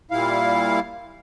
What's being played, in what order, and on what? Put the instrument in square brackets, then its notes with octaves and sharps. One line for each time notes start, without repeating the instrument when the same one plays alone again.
[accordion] A#2 G3 E4 F5